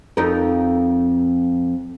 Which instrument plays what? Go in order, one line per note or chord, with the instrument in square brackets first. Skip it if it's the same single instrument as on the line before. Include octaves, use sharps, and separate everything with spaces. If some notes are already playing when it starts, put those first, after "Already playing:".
[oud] F2 D#4 A#4